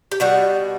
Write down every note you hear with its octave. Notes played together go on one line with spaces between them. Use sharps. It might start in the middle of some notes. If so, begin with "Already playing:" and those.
G4
B2 G3 F#4